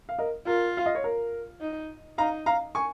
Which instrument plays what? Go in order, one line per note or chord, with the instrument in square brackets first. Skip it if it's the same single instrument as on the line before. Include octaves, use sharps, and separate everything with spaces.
[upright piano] F5
A#4 D#5
[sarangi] F4 [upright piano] A#4
[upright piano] F5
D#5
C#5
A#4
[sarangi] D#4
[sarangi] D#4 [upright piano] F5 A#5
[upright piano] F5 A#5
G#5 C#6